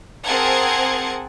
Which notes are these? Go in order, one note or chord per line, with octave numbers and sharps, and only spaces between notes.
C4 G#4 A#4 F#5 A5 G#6